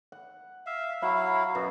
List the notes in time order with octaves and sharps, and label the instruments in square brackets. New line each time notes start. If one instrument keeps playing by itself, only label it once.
[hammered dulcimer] F#5
[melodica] E5 F5
[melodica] F#3 E4 F5 [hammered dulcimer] E5 B5
[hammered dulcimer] F#2 B2 B3